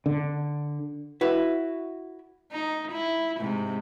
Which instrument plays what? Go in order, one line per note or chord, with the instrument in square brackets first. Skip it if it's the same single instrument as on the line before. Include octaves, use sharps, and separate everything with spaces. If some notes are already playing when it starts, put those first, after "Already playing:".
[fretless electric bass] D3
[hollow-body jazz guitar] E4 F#4 B4
[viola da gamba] D#4
E4
G#2 C3